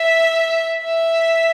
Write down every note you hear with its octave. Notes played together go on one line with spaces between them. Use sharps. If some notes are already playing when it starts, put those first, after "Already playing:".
Already playing: E5
E5